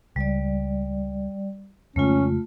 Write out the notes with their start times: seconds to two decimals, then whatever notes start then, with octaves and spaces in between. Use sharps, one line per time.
0.16 C#2 G3 D5
1.96 F2 C#3 G#3 A3 C#4 F4